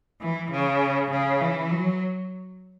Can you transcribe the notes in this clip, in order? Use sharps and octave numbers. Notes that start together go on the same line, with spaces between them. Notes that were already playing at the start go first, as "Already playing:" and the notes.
E3
C#3
C#3
E3
F#3